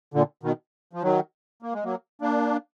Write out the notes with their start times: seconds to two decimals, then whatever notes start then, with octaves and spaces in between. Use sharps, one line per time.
0.14 A#2 D3
0.43 B2 D#3
0.93 F3
1.02 D#3 F#3
1.62 A#3
1.73 G#3
1.84 F#3 A#3
2.21 A#3 D4